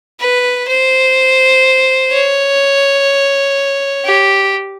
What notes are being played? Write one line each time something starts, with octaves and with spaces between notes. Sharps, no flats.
B4
C5
C#5
G4